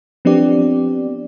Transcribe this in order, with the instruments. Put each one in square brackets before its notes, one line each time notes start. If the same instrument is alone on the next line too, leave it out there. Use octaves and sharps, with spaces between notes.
[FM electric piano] F3 B3 C4 D4 G4 D5